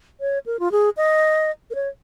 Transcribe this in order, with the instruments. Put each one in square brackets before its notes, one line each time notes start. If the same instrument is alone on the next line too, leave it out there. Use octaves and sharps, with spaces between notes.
[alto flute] C#5
A#4
F4
G#4
D#5
A#4
C#5